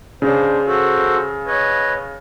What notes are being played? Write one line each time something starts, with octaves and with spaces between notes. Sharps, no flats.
C#3 D4 C5
F#4 A4 C5
B4 C#5 D#5